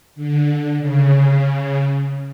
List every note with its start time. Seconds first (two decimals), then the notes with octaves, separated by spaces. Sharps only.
0.15 D3
0.79 C#3